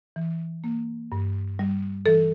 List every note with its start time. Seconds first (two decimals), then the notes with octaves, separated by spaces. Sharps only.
0.16 E3
0.64 A#3
1.12 G2
1.59 G3
2.06 E3 A4